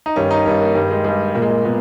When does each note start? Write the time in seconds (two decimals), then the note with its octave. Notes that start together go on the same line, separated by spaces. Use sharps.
0.06 D#4
0.16 G2 D#3 C#4
0.31 D#4
0.46 G2 D#3 C#4
0.61 A#3
0.75 G2 D#3
0.91 G#3
1.04 G2 D#3 G#3
1.35 A#2 A#3
1.42 G#3
1.50 A#3
1.64 A#2 B3